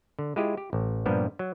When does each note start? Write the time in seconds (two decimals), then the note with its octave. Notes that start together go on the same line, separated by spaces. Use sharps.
0.19 D3
0.36 G#3 E4 F4 G4 G#4 D#5
0.57 G4
0.73 A1
1.06 G2 A#2 F3 G3 B3
1.39 F#3